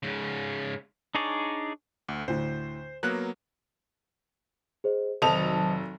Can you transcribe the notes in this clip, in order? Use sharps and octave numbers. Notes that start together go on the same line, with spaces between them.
G#2 C#3
D4 D#4 G#4 C#5 D5
D2
D2 A2 C5
F#3 A#3 B3 F#6
G#4 C5 D#5
F1 D#3 F#3 A4 C5 D#5 D#6 F7